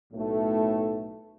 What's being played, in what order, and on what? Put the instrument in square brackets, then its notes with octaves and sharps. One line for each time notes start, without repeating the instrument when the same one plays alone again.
[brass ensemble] B1 A2 A3